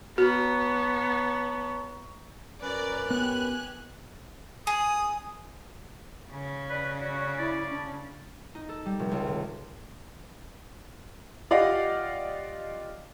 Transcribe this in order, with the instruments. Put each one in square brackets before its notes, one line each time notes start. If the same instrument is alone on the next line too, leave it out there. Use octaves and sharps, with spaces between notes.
[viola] B3 [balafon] F#4 [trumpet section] C#5 A5 A#5
[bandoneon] F#2 C#4 B4 [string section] A#4 D5
[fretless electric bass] B3 [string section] G4 G#5 F#6
[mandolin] G#4 [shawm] D#6
[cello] C#3 C#4
[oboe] B4 [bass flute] D5
[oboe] F#4
[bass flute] E4 [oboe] D5
[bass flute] D4
[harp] D#4
A4
G3
F1
C#2
G#1
[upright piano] F4 G4 D5 D#5 F5 F#5